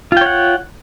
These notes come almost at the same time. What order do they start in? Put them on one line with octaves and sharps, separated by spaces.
F4 G5 C#5 F#5